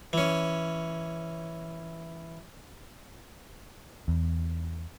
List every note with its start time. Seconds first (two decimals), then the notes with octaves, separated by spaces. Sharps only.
0.13 E3 C#4
4.08 E2